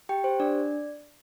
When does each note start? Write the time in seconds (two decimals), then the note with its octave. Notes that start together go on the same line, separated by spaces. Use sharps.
0.09 G4 G5
0.24 G4 C5
0.40 D4 D5